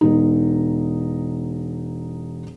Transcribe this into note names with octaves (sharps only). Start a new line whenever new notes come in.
E1 D#4